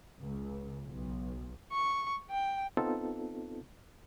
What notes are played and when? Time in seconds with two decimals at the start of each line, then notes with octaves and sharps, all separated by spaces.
0.22 C#2
0.85 B1
1.73 C#6
2.31 G5
2.77 B3 C4 D#4 F4 A4